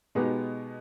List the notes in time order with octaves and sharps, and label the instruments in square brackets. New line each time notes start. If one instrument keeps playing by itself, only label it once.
[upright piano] B2 G#3 B3 D#4 G4